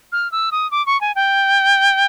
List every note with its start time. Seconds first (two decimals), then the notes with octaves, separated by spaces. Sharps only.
0.12 F6
0.32 E6
0.52 D#6
0.71 D6
0.86 C#6
1.01 G#5
1.15 G5